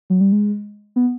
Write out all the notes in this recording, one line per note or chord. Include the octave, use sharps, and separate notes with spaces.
F#3
G3
G#3
B3